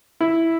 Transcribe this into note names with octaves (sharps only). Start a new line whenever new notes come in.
E4